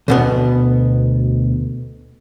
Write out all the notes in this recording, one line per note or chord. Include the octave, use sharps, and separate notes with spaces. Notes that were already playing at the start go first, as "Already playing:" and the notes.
D2 B2 B3